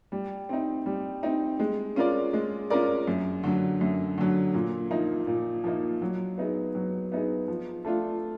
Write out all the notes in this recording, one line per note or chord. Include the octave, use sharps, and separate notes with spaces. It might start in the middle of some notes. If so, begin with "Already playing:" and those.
G3
C4 D#4
G3
C4 D#4
G#3
C#4 F4 A#4 D5
G#3
C#4 F4 A#4 D5
F#2
D3 F#3
F#2
D3 F#3
A#2
F3 A#3 D#4
A#2
F3 A#3 D#4
F#3
B3 D#4 G#4
F#3
B3 D#4 G#4
F3
A3 D4 F4